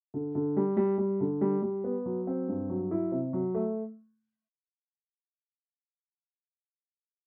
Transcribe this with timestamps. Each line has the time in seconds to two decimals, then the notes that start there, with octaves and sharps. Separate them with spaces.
0.14 D3
0.35 D3
0.57 G3
0.77 G3
0.98 G3
1.21 D3
1.41 G3
1.62 G3
1.84 B3
2.06 F#3
2.27 C4
2.48 G2
2.69 F#3
2.91 E4
3.12 C3
3.33 F#3
3.54 A3